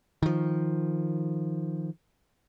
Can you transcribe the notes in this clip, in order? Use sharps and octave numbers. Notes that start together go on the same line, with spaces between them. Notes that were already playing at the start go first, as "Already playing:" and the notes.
D#3 F3